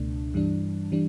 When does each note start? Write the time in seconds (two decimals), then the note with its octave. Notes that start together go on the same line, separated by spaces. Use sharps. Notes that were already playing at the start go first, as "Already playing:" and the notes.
Already playing: C#2 B2 A3 D4
0.34 G2 E3 G3 D4
0.92 E3 G3 D4